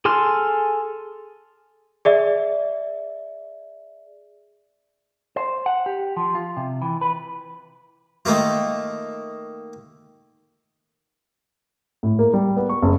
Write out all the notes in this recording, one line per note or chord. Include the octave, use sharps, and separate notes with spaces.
G#4 A4 G#5 C6 F6
G#4 D5 E5
C5
F#5
G4
F3
F4
C3
E3
B4
D#3 A3 A#3 F4
A2
A#3
G3
B3
C#6
F#1